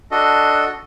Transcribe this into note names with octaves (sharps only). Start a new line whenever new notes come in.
D4 F#4 A4 D#5